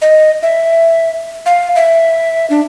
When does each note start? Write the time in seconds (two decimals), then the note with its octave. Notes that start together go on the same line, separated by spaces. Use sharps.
0.01 D#5
0.42 E5
1.46 F5
1.75 E5
2.50 D4